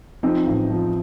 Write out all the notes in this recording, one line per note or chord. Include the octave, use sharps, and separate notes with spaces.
F3 C4 D#4
A1
F3